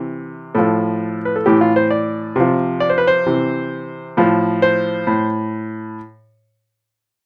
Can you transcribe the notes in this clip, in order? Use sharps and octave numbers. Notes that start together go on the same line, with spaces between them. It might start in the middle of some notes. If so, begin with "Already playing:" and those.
Already playing: C3 E3
A2 F3 A4
B4
A4
A2 E3 G4
F4
C5
D5
C3 F3
D5
C5
B4
C5
C3 E3
A2 F3
C5
A2